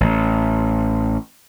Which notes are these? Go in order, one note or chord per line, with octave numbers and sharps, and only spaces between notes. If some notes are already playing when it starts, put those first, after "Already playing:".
A1